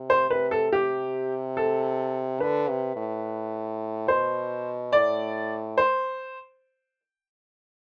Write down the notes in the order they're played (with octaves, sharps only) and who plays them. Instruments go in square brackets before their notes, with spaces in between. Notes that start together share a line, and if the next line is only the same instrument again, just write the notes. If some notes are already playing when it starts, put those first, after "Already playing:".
Already playing: [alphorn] C3
[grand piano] C5
[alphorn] C3 [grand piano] B4
[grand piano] A4
[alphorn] C3 [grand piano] G4
[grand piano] A4
[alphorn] D3 [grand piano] B4
[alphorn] C3
A2
[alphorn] B2 [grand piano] C5
[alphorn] A2 [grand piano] D5
[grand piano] C5